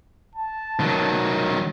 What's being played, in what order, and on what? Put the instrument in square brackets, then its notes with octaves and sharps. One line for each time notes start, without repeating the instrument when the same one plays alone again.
[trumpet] A5
[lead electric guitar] D#3 F#3